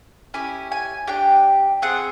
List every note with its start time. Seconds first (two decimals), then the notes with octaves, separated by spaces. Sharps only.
0.34 C#4 E4 G4 G#5
0.72 G#5
1.07 D4 G4 G5
1.82 C4 F4 G#4 F#5